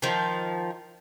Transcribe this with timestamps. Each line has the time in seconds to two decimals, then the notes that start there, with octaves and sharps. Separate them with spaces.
0.02 D#3 F3